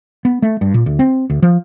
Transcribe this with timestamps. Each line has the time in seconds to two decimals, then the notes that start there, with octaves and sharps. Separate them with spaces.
0.25 B3
0.42 A3
0.61 G2
0.74 A#2
0.86 D2
0.99 C4
1.30 D2
1.42 F3